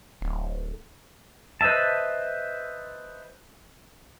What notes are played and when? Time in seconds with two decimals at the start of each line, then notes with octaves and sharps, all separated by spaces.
0.21 D1
1.61 B4 C5 D#5 E5 A5